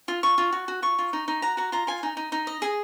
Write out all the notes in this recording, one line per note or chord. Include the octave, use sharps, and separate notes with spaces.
F4
F4 C#6
F4
F#4
F#4
F4 C#6
F4
D#4
D#4
F#4 A#5
F#4 A#5
F4 A#5
F4 G#5
D#4
D#4
D#4
D#5
G#4